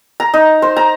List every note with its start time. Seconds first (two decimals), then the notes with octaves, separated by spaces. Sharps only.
0.20 A#5
0.34 D#4
0.62 C5
0.77 A#5